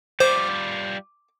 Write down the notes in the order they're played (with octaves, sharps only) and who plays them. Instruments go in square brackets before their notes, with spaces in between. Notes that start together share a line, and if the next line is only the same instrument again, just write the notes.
[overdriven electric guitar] G3 F4 [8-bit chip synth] C5 [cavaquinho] D6